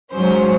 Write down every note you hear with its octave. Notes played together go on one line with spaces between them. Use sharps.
G#2 F#3 C#4 C5